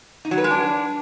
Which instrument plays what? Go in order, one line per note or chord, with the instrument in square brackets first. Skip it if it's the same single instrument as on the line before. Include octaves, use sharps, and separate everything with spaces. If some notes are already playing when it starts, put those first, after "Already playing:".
[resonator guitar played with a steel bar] D#4
F#3
B4
G#3
D4